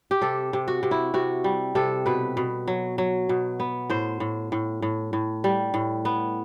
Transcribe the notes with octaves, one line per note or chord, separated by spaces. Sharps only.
G4
C3 A4
C3
F#4
C3
E4
C3 F#4
G3
C3 A4
B2 B4
B2
F#3
F#3
B2
B3
A2 C5
A2
A2
A2
A2
G3
A2
B3